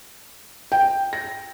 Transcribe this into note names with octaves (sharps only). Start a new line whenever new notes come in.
G5
A#6